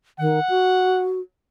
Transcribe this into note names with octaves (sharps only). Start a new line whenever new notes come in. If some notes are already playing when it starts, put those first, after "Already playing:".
D#3 F#5
F#4